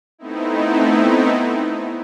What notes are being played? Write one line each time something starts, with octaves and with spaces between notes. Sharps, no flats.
A3 B3 C4 D#4 E4